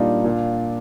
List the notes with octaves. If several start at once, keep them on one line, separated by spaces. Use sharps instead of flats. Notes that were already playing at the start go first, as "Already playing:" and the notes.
Already playing: A#2 G3 A#3 D4 D#4 F4
A#2